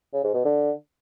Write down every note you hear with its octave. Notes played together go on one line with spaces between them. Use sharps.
C#3
G#2
B2
D3